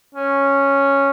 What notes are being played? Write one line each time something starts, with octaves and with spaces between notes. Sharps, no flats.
C#4